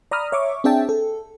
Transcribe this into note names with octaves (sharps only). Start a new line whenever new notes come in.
D5 A#5 B5 D#6 F6
C#5 E5 C#6 D6
C4 D4 G#4 E5 G5 A5
A4